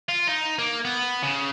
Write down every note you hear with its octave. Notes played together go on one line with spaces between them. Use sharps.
F4
D#4
A#3
B3
C#3